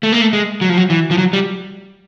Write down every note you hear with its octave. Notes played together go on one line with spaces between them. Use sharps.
A3
A#3
A3
G#3
F#3
F3
F#3
E3
F3
F#3
G3